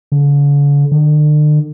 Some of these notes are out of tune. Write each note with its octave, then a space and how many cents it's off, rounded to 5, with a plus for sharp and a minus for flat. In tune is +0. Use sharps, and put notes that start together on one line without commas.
D3 -45
D3 +40